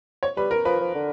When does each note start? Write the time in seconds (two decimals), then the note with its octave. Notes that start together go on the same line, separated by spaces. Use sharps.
0.23 C#5
0.37 G3 B4
0.51 A#4
0.65 F3 B4
0.80 F3
0.94 D3